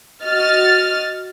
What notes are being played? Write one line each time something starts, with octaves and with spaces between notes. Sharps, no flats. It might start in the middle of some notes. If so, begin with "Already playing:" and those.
F#4 D#5 F6 A6